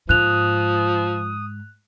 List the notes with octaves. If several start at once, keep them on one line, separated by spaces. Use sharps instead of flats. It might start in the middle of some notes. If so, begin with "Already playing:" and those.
G#2 F3 D#6 F#6 F7